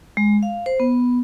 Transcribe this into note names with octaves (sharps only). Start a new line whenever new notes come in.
G#3
F5
C5
B3